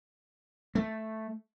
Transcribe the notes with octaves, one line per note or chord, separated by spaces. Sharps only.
A3